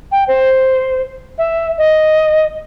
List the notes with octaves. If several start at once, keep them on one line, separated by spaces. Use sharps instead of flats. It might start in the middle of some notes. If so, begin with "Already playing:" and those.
G5
C5
E5
D#5